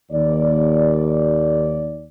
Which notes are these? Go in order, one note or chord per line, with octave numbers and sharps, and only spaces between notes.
D#2 D5